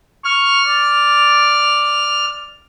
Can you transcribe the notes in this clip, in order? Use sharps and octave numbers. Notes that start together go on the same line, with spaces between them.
C#6 F6
D5